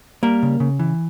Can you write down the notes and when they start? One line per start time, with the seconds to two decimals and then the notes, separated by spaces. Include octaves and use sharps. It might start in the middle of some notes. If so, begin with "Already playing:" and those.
0.23 G3 A#3 A#4
0.43 C#3
0.60 C#3
0.79 E3